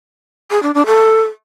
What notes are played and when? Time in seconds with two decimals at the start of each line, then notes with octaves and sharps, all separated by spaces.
0.51 G#4
0.63 D4
0.74 D4
0.86 A4